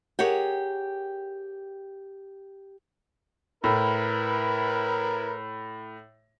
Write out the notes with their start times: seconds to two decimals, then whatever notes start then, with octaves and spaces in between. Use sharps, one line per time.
0.19 G4 G#4 A#4 C#5 F#5 G5
3.64 A2 E4 A#4 B4